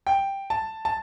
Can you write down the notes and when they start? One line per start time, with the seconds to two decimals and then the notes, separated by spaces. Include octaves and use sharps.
0.07 G5
0.50 A5
0.85 A5